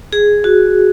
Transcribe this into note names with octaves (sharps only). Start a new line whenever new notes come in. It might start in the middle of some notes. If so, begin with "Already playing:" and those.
G#4
F#4